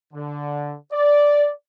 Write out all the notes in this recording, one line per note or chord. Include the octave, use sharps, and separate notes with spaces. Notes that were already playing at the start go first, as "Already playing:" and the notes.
D3
D5